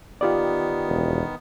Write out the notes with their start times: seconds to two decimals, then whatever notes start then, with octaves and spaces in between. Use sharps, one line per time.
0.21 D#3 B3 F4 G4 D5
0.88 E1